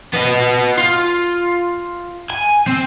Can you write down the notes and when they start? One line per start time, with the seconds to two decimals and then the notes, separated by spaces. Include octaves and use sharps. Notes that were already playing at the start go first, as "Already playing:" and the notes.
0.14 B3 D#5
0.77 F4
2.30 G#5
2.67 C4